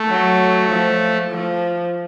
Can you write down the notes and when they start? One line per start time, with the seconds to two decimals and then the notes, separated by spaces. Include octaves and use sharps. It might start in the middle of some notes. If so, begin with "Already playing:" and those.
Already playing: A3
0.09 F#3
0.70 F3
1.31 F3